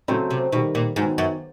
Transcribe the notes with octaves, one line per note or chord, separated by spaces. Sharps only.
A2 C#3 F#3 A3 C4
C3
B2 D#3 G3 A#3
A#2
G#2 D#3 F#3 B3
F#2